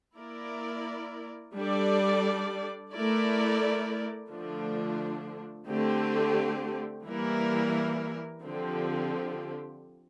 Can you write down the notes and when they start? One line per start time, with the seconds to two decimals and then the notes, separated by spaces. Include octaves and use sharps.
0.17 A#3 E4 A#4 D5
1.55 G3 D4 A4 D5
2.92 A3 E4 A#4 D5
4.29 D3 F3 A3 D4
5.67 D3 A3 C4 G4
7.04 E3 G3 A#3 E4 A#4
8.42 D3 F3 C4 G4